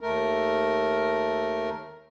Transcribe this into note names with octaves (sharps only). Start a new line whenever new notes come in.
D#2 A3 A#4